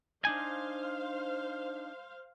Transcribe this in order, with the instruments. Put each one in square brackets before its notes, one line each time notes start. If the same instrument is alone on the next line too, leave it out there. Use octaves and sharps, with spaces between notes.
[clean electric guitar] D4 D#4 G#5 [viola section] C5 F5